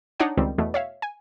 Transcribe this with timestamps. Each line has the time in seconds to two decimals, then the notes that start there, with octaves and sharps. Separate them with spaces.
0.20 D4 D#4 C#5 F#5 G5
0.37 C#2 D#3 G3 C4
0.58 E2 B2 A3
0.74 C#5 E5 F5
1.02 G#5